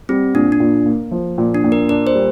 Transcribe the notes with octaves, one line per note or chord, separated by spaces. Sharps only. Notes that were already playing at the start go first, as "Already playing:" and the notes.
G3 C4
A#2 D4
D4
A#2
A#3
F3
A#2
D4
A#2
A#4
D4 A#4
C5
G3